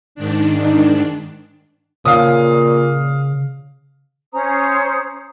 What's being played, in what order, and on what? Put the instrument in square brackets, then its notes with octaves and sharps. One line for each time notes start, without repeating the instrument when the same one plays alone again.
[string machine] G#2 D#3 D4
[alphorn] A#2 [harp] C#3 [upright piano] F5 D#6
[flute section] C#4 C5 A#5 D#6